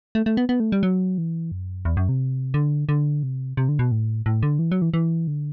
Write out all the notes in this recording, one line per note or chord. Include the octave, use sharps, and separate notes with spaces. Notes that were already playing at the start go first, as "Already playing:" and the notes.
A3
A3
B3
B3
A3
G3
F#3
E3
F#2
E2
F#2
C3
D3
D3
C3
C3
D3
B2
A2
A2
D3
E3
F#3
E3
E3
D3